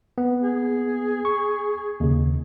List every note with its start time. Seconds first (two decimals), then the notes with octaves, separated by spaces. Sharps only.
0.18 B3
0.43 G#4
1.25 C#6
2.00 D#2 C#3